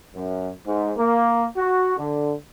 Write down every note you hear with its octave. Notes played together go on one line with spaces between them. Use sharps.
F#2
G#2
A#3
F#4
D3